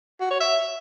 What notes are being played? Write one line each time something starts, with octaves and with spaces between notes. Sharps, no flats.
F#4
C#5
E5